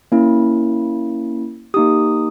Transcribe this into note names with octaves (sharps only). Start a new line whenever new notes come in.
A#3 C#4 E4
A#3 D#4 G4 D#6